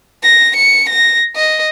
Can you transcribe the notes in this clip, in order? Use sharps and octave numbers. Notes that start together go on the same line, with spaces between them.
A#6
C#7
A#6
D#5